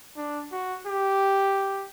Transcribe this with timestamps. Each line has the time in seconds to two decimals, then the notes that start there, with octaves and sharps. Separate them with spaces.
0.16 D4
0.52 F#4
0.87 G4